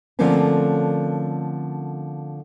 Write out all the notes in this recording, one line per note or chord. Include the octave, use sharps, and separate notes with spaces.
D3 F3 A3 A#3 C4 C#4